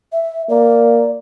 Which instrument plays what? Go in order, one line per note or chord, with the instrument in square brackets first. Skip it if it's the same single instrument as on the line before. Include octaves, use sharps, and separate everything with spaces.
[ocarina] E5
[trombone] A#3 [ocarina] D5